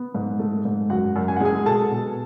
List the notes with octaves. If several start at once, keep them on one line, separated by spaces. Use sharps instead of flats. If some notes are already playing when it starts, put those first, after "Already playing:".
Already playing: B3
G#2
A3
G#2
F#2 F#4 F#5
F#2
G#5
F#5
G#3 G#4 G#5
B2 A4 A5
B2